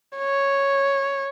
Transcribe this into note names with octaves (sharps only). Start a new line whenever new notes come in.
C#5